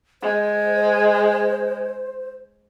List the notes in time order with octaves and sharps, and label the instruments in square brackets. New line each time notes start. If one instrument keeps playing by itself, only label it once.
[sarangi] G#3 [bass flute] C5